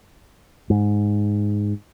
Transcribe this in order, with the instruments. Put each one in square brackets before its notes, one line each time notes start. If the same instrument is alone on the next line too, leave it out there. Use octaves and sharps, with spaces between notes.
[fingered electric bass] G#2